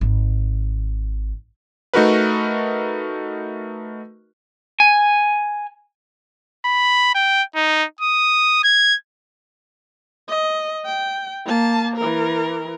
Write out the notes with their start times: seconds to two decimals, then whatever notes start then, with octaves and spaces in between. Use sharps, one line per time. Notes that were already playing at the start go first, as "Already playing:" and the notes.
0.01 G#1
1.94 A3 D#4 F#4 A#4 B4
4.80 G#5
6.65 B5
7.14 G5
7.55 D#4
8.00 D#6
8.64 G#6
10.28 D#5
10.85 G5
11.45 A#3 A5
11.97 E3 A#4